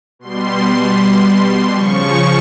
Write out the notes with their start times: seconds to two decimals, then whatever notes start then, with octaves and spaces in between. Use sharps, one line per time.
0.19 B2 G3 C6
1.73 C#3 F3 C#6